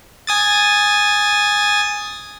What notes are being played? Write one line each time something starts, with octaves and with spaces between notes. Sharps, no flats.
G#5 D#6 A6